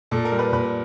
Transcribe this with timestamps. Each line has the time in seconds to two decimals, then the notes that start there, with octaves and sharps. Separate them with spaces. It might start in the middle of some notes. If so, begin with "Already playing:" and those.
0.11 A#2 A4
0.25 A#4
0.32 G3
0.39 B4
0.52 A#2 B4